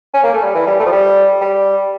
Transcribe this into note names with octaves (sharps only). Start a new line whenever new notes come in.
C#4
A#3
A3
G3
E3
G3
A3
F3
G3
G3